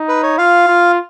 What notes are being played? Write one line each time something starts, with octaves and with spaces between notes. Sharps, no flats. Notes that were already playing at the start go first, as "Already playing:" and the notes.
Already playing: D#4
B4
C#5
F4 F5
F4